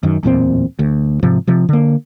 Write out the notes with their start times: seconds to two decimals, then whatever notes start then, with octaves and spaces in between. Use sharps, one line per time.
0.03 F#2 D#3
0.23 D1 E2 A#2 C4
0.79 D2
1.23 G#2 C3 F3
1.47 C3 F3
1.69 D3 A#3